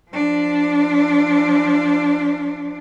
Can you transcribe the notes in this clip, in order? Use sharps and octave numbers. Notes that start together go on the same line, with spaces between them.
F3 D4